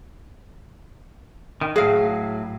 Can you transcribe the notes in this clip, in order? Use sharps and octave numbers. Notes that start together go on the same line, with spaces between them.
D#3
A2 F#3 G#4 F5